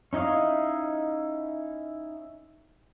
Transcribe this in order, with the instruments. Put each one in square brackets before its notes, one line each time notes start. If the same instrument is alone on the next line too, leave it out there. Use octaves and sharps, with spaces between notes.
[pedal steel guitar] C#4 D#4 E4 D#5 F5